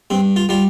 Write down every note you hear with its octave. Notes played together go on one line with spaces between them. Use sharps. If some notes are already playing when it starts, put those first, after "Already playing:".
G2 C4
F4
G3 F4